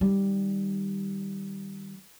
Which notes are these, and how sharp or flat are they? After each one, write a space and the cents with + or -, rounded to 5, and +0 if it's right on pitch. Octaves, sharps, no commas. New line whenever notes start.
D#3 +0 G3 +0